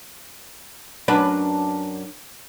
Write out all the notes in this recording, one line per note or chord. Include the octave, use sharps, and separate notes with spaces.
F#2 D4 B4